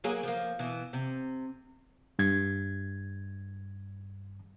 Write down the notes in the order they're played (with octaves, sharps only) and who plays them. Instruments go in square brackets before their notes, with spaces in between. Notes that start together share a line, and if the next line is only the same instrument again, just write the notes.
[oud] F#3 A#3 G#4
F3 A#3
B2 E3
C3
[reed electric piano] G2 G#6